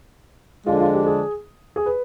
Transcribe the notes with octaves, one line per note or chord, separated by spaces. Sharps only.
D3 F3 G#3 D4 F4
F4
G4
G#4
G#4
B4